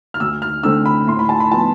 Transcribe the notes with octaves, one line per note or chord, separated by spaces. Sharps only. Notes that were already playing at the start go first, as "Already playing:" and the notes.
F6
D2 E6
F6
D3 A3 C4 E6
B5
A2 C6
B5
A5
B5
F3 B3 A5